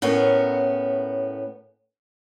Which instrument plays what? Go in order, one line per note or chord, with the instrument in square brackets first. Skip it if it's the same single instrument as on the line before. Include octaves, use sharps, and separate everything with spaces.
[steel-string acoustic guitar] A2 B3 C#4 A#4